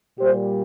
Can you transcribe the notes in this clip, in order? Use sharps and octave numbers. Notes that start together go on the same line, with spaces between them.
A#2 G3 G4 C5